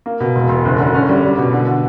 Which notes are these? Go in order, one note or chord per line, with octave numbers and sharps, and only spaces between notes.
A#3
B2
E1
E1
F#1
D3
C#4
G3
G3
B2
D3
D3